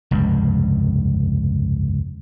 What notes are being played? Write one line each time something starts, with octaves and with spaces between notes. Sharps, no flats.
F1 C#2 G2